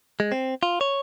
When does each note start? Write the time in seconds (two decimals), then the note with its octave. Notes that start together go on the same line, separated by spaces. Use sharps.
0.20 G#3
0.32 C4
0.63 F4
0.81 C#5